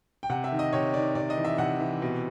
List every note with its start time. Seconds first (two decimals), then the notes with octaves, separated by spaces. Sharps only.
0.23 G5
0.30 C3 F#5
0.44 E5
0.52 D#3
0.59 D#5
0.73 C3 C#5
0.94 D#3 D5
1.15 C3 D5
1.30 D#5
1.37 E3
1.45 E5
1.58 C3 F#5
1.80 E3
2.02 B2